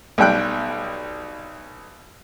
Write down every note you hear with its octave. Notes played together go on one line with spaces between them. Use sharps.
B1 G3 G5 F#6